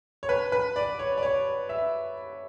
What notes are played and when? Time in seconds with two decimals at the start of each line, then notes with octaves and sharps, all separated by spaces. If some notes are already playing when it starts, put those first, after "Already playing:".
0.23 C#5
0.29 B4
0.52 B4
0.76 D5
0.99 C#5
1.17 D5
1.23 C#5
1.69 E5